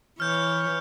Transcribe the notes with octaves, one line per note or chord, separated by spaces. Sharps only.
E3 C#5 F6 G6